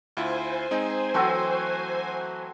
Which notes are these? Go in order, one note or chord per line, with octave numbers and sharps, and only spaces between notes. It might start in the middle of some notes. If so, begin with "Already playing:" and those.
D2 E4 F4 C5 G#5
G#3 C4 D#4
E3 F#3 A3 C4 F#4